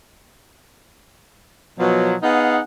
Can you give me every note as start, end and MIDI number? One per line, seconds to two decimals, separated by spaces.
1.79 2.15 47
1.79 2.15 53
1.79 2.15 54
2.23 2.60 59
2.23 2.60 63
2.23 2.60 68
2.23 2.60 77
2.23 2.60 78